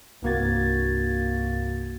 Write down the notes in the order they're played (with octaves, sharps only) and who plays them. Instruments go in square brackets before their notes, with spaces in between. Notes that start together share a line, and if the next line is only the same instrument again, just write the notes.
[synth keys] C2 G2 A#3 F#4 G#6 A6